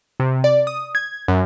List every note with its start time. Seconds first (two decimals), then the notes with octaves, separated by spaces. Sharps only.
0.20 C3
0.44 D5
0.67 D#6
0.95 G#6
1.28 F#2